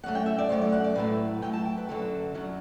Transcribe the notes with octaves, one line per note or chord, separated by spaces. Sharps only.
F#2 F#3 A3 F#5
G5
E5
D5
F#2 F#3 A3 C5
D5
F#5
D5
A2 F#3 A3 B4
A2 F#3 A3 G5
A5
G5
B4
F#2 D3 F#3 A4
F#2 D3 F#3